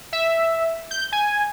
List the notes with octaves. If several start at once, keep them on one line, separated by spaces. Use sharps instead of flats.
E5
G6
G#5